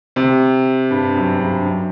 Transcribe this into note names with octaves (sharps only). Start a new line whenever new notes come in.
C3
G2
F#2
G2
F#2